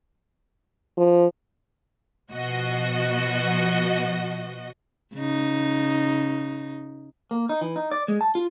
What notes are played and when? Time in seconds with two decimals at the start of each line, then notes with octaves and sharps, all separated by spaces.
0.98 F3
2.30 B2 F3 F#4 D#5
5.15 C#3 D#4
7.31 A#3
7.49 D#4
7.61 E3
7.76 D#4
7.91 D5
8.08 G#3
8.21 A5
8.35 F4